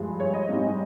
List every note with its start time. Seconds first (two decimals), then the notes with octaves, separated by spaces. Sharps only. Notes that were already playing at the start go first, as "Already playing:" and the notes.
Already playing: G2 F3 G#3
0.20 C#5
0.34 D#5
0.49 G#2 G3 C4